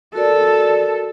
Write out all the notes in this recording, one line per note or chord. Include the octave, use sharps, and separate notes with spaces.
F#4 A4 A#4 D5